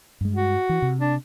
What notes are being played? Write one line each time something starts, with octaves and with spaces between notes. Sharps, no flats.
G2 G#3
F#4
E3
C3
D4